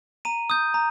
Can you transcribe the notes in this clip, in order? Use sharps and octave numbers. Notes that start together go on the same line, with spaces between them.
A#5 D#7
D#6 G6
A#5